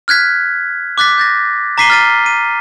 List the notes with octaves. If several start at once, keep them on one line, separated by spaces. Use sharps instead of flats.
F6 F#6 G#6 B6
D6 F#6 A6 B6
G6 A6 A#6
A#5 D6 B6 C7 D#7 G7
F6 A6 D#7
D#7